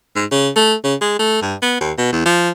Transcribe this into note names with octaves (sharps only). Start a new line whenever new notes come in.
G#2
C#3
A3
C#3
G#3
A3
G2
B3
D#2
B2
E2
F3